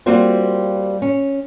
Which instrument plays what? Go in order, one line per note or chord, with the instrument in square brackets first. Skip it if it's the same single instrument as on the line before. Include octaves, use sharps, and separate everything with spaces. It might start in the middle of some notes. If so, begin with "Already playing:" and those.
[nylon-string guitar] G3 A#3 C4 F4 F#4
C#4